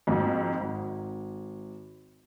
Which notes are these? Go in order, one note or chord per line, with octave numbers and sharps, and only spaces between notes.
F2 G#2 F#3 A#3
G#1